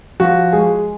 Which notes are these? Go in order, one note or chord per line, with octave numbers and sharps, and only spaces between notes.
F3 F#4
G#3 G#4